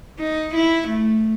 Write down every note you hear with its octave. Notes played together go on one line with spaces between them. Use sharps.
D#4
E4
A3